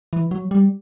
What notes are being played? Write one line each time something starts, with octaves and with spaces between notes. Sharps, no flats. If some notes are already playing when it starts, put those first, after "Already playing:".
E3
F#3
G3